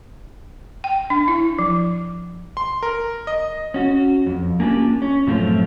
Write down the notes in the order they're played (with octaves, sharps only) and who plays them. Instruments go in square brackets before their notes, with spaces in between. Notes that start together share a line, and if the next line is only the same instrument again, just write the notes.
[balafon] G5
D4
E4
F3
[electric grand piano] C6
A#4
D#5
[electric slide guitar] C#4 F#4
F2
A#3 C#4 D4 F4 G4
C#4
F#2 A2 F3 A3 C4 F4